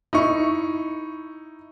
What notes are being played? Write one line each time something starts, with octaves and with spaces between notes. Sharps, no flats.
D#4 E4 C#6